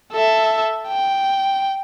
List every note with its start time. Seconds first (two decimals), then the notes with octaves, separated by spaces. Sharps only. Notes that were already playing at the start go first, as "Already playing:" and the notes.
0.12 A4 E5
0.88 G5